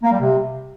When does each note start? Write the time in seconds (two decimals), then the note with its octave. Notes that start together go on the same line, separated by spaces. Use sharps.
0.03 A#3
0.11 G3
0.19 C3